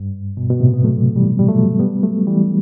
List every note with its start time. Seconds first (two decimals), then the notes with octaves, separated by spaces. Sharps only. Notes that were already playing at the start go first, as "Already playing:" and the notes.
Already playing: G2
0.37 B2
0.50 B2
0.60 A2 C3
0.73 B3
0.84 F#3 A3
1.16 E3 G3
1.39 G3
1.48 F#3 A3
1.79 G3 B3
2.03 F#3 A3
2.27 E3 G3